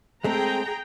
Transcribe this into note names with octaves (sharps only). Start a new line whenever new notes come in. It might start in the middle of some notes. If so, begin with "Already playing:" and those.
G#3 A3 C4 G#4 G5 A#5